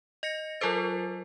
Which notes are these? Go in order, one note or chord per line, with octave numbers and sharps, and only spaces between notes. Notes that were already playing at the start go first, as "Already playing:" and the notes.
D#5 A#6 C#7
F#3 F4 A4 A#4 C5 A6